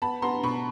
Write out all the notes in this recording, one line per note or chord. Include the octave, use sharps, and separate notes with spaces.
B3 A5 B5
B3 A#5 C6
B2 B5 C#6